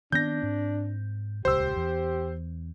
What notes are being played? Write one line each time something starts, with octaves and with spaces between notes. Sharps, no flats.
D#3 B3 C4 D4 G6 A#6
G#2 C4
D#1 C#2 G4 C5 E6
E2